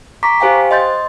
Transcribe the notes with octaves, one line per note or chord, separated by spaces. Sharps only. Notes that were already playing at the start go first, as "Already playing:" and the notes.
A#5 C#6 D6 B6
G4 C5 F5 G5 G#5
C5
D#5 C6 G6 A6